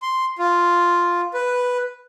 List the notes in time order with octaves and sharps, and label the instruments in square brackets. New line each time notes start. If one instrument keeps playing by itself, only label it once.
[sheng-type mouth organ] C6
F4
B4